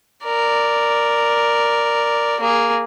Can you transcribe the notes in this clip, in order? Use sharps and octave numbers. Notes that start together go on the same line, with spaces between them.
A#4 D5
A#3 G#4